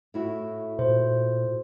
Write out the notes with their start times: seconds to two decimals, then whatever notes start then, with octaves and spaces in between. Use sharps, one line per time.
0.14 A2 E4 F#4
0.79 A#2 C5